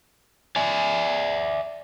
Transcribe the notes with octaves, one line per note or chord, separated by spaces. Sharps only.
D5 E5 G#5